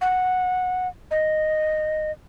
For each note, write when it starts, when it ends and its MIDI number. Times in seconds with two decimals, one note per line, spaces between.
0.01 0.88 78
1.11 2.11 75